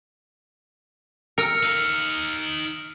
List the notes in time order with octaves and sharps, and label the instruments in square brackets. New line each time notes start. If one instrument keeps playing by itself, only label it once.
[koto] A#4 [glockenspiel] E6 F6 C#7
[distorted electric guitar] D#4 F5